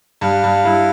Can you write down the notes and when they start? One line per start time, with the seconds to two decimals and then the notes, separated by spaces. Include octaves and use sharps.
0.21 G2 F5
0.44 G2
0.65 G2 E4